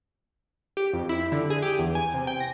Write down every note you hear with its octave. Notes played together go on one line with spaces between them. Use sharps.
G4
F2
E4
D3
G#4
G4
E2
G#5
C3
G5
A#6